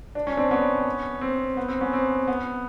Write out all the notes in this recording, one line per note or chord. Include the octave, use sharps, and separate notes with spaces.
D4
C#4
C4 D4
B3 C#4
C4
B3
C4
B3 C#4
C4
B3